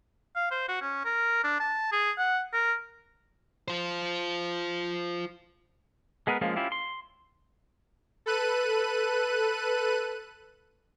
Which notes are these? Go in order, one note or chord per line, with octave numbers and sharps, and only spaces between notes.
F5
C5
F#4
C#4
A#4
D4
A5
G#4
F#5
A#4
F4 C5
G#3 B3 G#4 A#4 B4
F3 G#3 A#3 C#4 F4
C#4 E4 F4 G4
C6
A4 B4 F#6 D#7